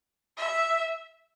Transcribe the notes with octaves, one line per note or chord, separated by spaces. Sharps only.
E5